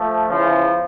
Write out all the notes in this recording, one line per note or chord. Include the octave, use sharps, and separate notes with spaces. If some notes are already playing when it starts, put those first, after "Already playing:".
Already playing: F3 A3
E2 C#3 E3 F3